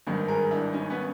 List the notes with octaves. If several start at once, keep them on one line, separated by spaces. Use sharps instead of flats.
G#1 G2 D#3
G#4 A#4
D4 E4
C#4 D#4
B3 C#4